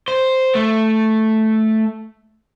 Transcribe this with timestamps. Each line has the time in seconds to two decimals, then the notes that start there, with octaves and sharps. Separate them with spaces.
0.08 C5
0.55 A3